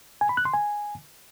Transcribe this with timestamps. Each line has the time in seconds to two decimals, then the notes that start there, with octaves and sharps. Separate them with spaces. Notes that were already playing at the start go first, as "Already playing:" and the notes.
0.21 G#5
0.29 B5
0.37 F#6
0.45 C6
0.53 G#5